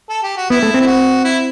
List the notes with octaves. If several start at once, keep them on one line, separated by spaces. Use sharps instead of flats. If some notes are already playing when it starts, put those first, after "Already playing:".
A4
G4
F#4
B3 E4
A3
C4
E4
F#4
E4